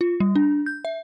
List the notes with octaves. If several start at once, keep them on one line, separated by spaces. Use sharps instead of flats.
F4
G3
D4
G6
E5